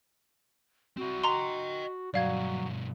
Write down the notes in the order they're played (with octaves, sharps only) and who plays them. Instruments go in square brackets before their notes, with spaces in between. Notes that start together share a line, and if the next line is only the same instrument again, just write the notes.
[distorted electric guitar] C4 E4 [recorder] F#4
[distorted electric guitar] D#5 G5 [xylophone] A#5 C6
[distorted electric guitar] G2 B2 [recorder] F#3 [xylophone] D5 F5 G#6